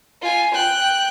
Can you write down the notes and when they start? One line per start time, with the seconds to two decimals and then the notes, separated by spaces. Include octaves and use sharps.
0.22 F4 G#5
0.54 G5 F#6